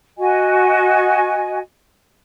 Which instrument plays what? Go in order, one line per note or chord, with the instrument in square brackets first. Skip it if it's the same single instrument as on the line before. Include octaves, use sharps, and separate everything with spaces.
[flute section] F#4 D#5 G#5